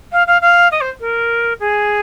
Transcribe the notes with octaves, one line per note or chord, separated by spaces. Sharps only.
F5
F5
F5
D#5
C5
A#4
G#4